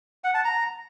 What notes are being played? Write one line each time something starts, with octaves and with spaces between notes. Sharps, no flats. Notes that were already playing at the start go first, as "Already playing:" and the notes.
F#5
A5
A#5